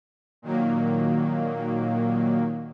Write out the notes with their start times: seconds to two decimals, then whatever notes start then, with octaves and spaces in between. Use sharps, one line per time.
0.42 A#2 D#3 F#3 A#3